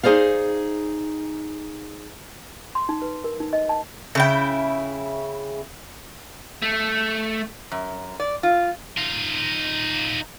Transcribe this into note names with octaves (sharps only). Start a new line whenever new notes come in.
D#4 G#4 C5 D5 F5
C6
D#4
B4
A#4
D#4
D#5
A5
C#3 E4 G5
A3
F#2
D5
F4
D#4 F4